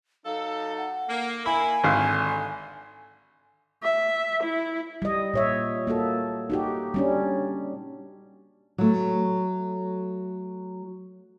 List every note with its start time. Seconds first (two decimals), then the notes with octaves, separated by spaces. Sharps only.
0.25 F#3 D#4 A4 F5
0.78 F#5
1.09 A#3
1.46 A#3 E4 G#5 B5
1.84 G#1 D3 F5
3.83 E5
4.43 E4
5.02 G3 D#5
5.34 A#2 C#5 E5
5.87 A#3 F#4 A4
6.50 D#4 F#4 G4
6.94 G3 C#4 D4
8.78 F#3 A3